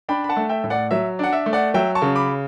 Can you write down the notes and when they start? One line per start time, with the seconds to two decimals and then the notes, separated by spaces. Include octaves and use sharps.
0.09 D4 G5 B5
0.24 B5
0.29 F#5 A5
0.37 A3
0.49 E5 G5
0.64 A2
0.70 D5 F#5
0.91 F#3 E5
1.19 D4 F#5
1.33 E5
1.46 A3
1.53 D5 F#5
1.74 F#3 E5 G5
1.95 A5 C#6
2.02 C#3
2.16 B5 D6